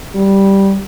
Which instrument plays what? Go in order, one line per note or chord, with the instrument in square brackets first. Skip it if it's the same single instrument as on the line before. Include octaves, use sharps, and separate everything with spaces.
[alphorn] G3